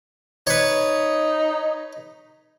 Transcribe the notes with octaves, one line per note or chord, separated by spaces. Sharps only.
D#4 B4 C#5